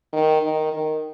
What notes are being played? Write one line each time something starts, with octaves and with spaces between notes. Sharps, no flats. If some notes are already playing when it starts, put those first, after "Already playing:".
D#3
D#3
D#3